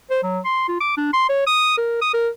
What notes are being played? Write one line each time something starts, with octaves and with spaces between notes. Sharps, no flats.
C5
F#3
C6
F4
D6
D4
C6
C#5
D#6
A#4
D#6
A#4